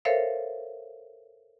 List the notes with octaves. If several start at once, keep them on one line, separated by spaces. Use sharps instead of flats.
A4 A#4 C5 C#5 E5 F5